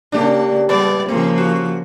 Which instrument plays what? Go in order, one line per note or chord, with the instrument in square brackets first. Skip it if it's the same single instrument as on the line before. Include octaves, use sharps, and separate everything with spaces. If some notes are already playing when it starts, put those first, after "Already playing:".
[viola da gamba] C#3 A#3 [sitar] D4 G4
[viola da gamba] G3 D5 [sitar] G#3 B3
[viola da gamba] C#3 F3 A#3 [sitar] C4
[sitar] F#4